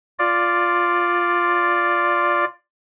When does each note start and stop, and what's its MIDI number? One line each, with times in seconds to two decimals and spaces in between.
0.19 2.45 65
0.19 2.45 74